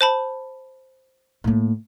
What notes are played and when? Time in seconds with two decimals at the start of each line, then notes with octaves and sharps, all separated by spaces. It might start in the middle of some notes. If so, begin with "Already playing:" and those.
0.01 C5 A5 B5
1.44 A2 A#3